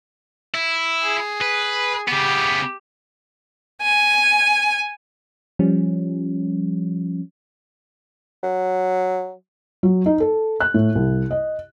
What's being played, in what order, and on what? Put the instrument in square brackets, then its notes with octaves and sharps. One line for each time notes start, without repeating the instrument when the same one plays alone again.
[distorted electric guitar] E4
[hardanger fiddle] G#4
[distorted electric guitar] B4
[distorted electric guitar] C#3 B3 [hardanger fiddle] G4
[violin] G#5
[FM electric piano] F3 G3 C#4
[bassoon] F#3
[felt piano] F#3
D#4
A4
F#6
A2
C2
D#5